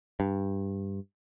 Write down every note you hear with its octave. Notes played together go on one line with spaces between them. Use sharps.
G2